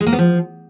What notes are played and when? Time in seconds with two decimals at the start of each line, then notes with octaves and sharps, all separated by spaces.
0.01 G#3
0.07 A#3
0.13 B3
0.19 F3